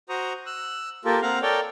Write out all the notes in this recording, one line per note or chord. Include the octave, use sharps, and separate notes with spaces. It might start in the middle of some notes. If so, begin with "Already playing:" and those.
F#4 C5 A#5 C#6 D#6
E6 F#6
A#3 F4 G4 A4 A#4
A#3 C4 F5 F#5 A#5
A4 A#4 C#5 D5 G5